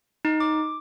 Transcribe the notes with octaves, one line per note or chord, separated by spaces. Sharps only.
D#4
D6